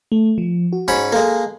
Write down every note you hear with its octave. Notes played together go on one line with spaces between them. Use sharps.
A3
F3
F#4
G#2 C#4 B5
G#3 A#3 A4